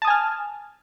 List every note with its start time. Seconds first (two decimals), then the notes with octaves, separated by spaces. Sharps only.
0.02 A5
0.05 D#6
0.07 G#5
0.10 F6